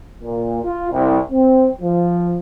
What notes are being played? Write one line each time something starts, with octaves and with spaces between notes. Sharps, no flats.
A#2
F4
C2
C4
F3